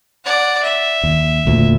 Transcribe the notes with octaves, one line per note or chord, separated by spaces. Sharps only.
D5 F#5
E5
D#2
E1 D2 A#2